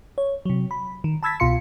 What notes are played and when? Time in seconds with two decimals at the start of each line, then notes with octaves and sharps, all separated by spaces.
0.18 C#5
0.46 C3 F#3
0.71 B5
1.04 D#3
1.23 A5 B5 E6 G#6 A6 B6
1.40 C2 B2 F4 F5 C6 C#7